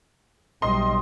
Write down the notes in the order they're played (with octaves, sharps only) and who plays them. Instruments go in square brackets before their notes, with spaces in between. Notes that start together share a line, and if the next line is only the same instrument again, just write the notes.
[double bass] B1 G3 [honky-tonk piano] D#5 C6